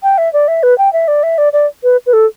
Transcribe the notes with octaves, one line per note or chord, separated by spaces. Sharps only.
G5
E5
D5
E5
B4
G5
E5
D5
E5
D5
D5
B4
B4
A4